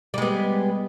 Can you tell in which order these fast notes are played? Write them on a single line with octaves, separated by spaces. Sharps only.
G3 G#3 B3